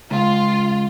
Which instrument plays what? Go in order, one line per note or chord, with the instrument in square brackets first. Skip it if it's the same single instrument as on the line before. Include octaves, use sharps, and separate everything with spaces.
[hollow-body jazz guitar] C#2 [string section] F4